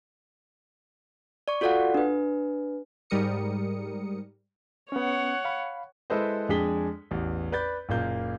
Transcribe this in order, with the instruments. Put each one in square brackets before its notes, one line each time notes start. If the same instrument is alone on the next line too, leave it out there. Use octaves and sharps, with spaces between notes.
[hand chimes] D5 C#6
F4 F#4 A4 D5 F5 F#5
D4 B4
[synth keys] G#2 G3 A#4 D#6 C#7
[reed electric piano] B3 C#4 [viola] C#5 F#5
[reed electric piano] F5 B5
[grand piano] G#3 E4 A4 B4 C5 D#5
F2 G#3 D4 G#4 B6 G7
A1 E2
B4 D5 B5 G6 A6
F#1 A#2 A#3 G6